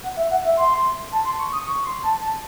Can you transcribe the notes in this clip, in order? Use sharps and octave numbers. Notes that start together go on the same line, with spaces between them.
F#5
E5
F#5
E5
C6
A5
C6
C#6
D#6
C#6
C6
A5
A5